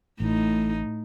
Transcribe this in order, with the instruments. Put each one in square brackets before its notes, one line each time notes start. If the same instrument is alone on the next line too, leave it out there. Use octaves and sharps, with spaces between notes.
[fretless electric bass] A1 [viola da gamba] A2 D#4